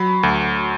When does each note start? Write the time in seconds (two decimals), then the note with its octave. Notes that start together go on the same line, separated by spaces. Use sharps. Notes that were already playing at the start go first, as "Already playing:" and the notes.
Already playing: F#3 B5
0.23 D2